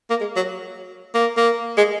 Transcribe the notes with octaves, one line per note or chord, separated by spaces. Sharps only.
A#3
G#3
F#3
A#3
A#3
G#3